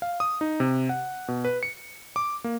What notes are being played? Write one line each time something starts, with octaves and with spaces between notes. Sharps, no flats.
F5
D#6
D#4
C3
F#5
B2
B4
C#7
D6
A#3